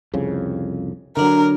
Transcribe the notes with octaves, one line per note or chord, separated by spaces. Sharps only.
C2 F2 C#3
D3 D#3 F#3 D4 A#4 A#5